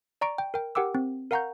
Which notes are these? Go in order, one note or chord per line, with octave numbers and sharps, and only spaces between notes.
D5 A#5 C#6 D7
G5
A#4 G5
G4 A#4 F#5 G5 D6 E6
C4
A#4 F5 F#5 A#5 C#6 G6